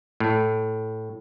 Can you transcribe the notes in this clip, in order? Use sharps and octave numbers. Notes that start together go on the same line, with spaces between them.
A2